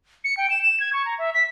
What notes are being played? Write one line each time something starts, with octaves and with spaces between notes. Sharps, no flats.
C#7
G5
E7
E7
G#6
C#6
A#5
E5
B6